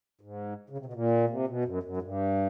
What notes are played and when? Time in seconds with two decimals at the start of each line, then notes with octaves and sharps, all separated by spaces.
0.21 G#2
0.70 C#3
0.78 C3
0.86 B2
0.93 A#2
1.29 C3
1.48 B2
1.65 F#2
1.83 F#2
1.97 G#2
2.02 G2